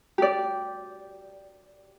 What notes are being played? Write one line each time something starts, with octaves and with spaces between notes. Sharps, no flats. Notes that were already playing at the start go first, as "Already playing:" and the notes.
G4 D5